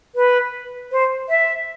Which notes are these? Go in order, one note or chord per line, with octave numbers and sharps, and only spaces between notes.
B4
C5
E5